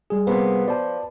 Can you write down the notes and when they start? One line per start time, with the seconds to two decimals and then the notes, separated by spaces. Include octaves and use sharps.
0.10 G3 G#4
0.27 C3 A#3 B3
0.68 F3 D5 A5